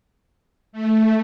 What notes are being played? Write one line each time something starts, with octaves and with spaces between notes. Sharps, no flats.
A3